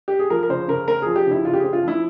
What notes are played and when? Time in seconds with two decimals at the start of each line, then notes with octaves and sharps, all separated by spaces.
0.08 G4
0.19 G#4
0.30 F3 A#4
0.43 A#4
0.49 C#3 C5
0.68 C#3 A#4
0.88 C4 A#4
1.02 F3 G#4
1.16 G4
1.26 C#3 E4
1.45 C#3 F4
1.53 G4
1.60 C4 G#4
1.73 F4
1.83 F3 E4